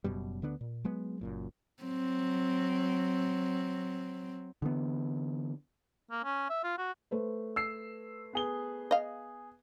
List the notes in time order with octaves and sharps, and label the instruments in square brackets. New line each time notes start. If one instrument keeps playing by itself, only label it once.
[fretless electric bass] F#1 F#2 B2 G3
D2 D3 B3 D4
A#2
F#3 G#3 B3
F#1 F#2 A#2
[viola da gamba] F#3 C4
[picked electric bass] D3 E3 B3
[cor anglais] A#3
C#4
E5
F4
F#4
[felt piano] A3 B4 C5
[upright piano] E6 C7
B3 G#4 G7
[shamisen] D#5 F5